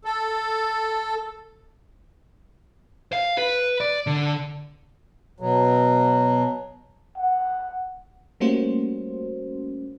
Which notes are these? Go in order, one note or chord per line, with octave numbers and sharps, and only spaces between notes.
A4
F5
B4
D5
D3
B2 F#3
F#5
G3 A3 A#3 C#4 F#4 C5